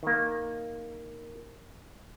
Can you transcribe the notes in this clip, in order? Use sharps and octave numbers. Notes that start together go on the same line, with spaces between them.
D#3 A#3